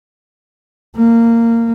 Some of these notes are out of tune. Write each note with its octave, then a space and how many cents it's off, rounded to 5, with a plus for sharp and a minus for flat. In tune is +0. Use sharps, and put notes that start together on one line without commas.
A#3 -15